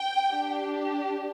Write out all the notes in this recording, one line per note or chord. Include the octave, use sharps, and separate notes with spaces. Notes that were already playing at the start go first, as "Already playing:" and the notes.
Already playing: G5
D4 G4